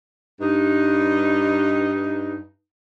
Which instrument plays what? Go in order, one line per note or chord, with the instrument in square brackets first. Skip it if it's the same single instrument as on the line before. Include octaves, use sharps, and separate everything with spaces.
[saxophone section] G2 D#4